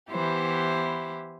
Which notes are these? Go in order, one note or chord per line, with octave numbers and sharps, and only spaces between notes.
E3 B3 E4 G4 C5